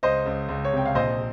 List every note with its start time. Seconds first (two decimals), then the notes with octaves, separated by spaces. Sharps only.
0.03 C#2 C5 D#5
0.26 C#2
0.49 C#2
0.65 C#5
0.72 C3 G5
0.86 F5
0.95 A#1 C5 D#5